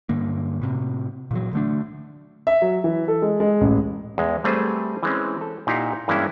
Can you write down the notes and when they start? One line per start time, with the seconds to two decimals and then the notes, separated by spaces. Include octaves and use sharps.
0.09 G2 D3 A#3
0.61 A2 C3
1.31 A#2 E3 F#3
1.53 D3 A3 D4
2.47 E5
2.62 F#3
2.84 E3
3.08 A4
3.22 G#3
3.40 G#3
3.61 A1
4.18 E2 G#3
4.44 G3 A3 C4 G#4 B4 C5
5.03 E3 G#3 C4 C#4
5.41 A4
5.67 A#2 D#4 E4 G4 F5 F#5
6.08 G2 E3 G#3 A#3 C#4 E4